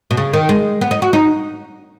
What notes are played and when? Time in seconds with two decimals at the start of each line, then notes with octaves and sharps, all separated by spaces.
0.11 B2
0.17 C#3
0.33 D#3
0.49 G#3
0.81 B3
0.91 D#4
1.02 F#4
1.13 D#4